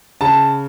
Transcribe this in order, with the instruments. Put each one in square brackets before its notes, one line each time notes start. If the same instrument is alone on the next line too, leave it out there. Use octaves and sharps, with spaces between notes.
[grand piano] C#3 A5